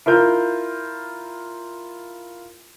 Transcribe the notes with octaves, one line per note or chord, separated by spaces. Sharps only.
E4 F4 A#4 G6